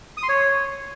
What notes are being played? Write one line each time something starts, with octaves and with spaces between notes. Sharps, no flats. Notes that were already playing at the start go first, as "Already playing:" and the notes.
D#6
C6
C#5